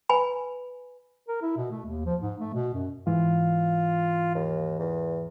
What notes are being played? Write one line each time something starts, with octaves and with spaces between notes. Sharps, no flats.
B4 G#5 B5
A#4
E4
B2
A3
D#2
F3
G#2
A3
B2
F#2
G#2 E3 F4
D#2
E2